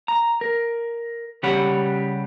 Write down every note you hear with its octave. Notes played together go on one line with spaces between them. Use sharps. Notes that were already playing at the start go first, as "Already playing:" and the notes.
A#5
A#4
C#3 G3 G4 C#5 F#5 B5